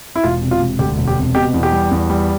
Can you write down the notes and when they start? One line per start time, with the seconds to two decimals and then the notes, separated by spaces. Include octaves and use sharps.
0.16 E4
0.24 E1 F4
0.42 C3
0.51 F4
0.60 E1
0.79 D2 G4
0.98 E1
1.08 G4
1.16 C3
1.35 B2 G4
1.54 E2
1.63 G4
1.72 G3
1.91 E2
2.10 G3